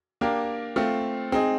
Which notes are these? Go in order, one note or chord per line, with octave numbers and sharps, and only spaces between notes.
A#3 D4 G4 A#4
A3 C4 F4
G#3 C4 D#4 G#4